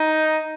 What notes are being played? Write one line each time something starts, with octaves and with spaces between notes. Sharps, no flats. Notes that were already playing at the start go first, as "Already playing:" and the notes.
Already playing: D#4